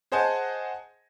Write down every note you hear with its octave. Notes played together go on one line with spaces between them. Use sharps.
G#4 C5 D#5 F#5 G#5 A5